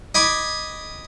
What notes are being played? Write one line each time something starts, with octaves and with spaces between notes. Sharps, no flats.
D#5 G#5 B5 D6